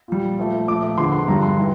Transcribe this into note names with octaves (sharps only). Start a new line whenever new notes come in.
A#2 G3
A#2 F3 A3
A#2 F3 A3 D6
D6
E2 D3 F3 C6
C6
G2 D3 G3 A#5
C6
E3 G3